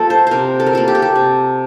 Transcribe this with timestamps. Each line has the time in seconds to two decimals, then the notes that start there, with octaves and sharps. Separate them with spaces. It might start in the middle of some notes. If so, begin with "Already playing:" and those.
Already playing: F3 A#3 G4 A4
0.10 C5
0.27 C3 A#4 C5
0.60 A4
0.66 A#4
0.73 F3 A#3 A4
0.88 G4
0.95 A4
1.02 G4
1.16 C3